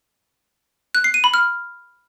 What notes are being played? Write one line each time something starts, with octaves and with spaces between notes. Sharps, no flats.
F#6
C7
D#7
B5
F6